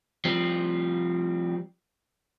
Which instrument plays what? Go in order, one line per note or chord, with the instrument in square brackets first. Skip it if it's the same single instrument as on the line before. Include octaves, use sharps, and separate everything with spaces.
[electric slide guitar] F3 G3 C4